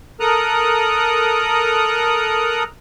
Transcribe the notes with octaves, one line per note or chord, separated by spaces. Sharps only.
A4 A#4 A#5 D#6 F#6